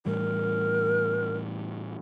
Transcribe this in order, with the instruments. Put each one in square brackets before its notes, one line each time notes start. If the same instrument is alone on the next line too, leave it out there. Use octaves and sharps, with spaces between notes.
[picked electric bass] A2 E3 G3 [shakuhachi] A#4